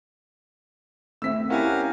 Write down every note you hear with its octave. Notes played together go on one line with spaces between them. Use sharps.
A3 C4 E5 E6 B6
C#4 E4 G4 A#4 F5 F#5 G#5